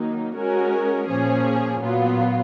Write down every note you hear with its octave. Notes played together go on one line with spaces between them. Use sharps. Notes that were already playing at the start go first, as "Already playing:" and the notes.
Already playing: D#3 F#3 A#3 D#4
G#3 C#4 F#4 A#4
A#2 F3 A#3 C#4 G#4
A#2 F#3 B3 F4